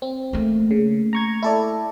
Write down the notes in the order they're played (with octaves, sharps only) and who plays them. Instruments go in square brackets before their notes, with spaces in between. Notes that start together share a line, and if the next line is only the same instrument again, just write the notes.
[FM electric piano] C4
[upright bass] A3 A#3
[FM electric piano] C#3
A#5 C#6 G#6
E4 A4 D5